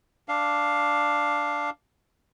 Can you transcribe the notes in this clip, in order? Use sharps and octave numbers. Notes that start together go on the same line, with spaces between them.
D4 F5